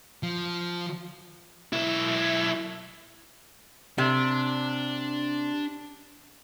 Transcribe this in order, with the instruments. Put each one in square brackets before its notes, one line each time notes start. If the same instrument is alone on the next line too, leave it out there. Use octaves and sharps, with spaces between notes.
[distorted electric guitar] F3
[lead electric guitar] B1 E4
[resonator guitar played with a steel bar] C3 [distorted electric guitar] D4